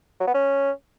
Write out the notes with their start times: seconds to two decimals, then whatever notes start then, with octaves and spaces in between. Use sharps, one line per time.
0.20 F#3
0.27 B3
0.34 C#4